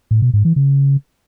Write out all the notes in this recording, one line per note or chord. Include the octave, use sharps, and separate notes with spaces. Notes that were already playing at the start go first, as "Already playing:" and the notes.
A2
B2
G#2
E3
C#3